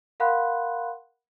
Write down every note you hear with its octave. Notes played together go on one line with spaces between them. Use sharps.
A#4 F5 F#5 B5 C6 F#6